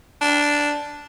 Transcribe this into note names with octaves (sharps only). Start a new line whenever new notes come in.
D4